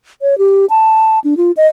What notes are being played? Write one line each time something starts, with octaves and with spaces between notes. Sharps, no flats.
C#5
G4
A5
D4
F4
D#5